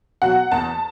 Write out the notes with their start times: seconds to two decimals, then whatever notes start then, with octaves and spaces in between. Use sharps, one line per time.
0.22 B2 F#3 F#5
0.52 E2 A5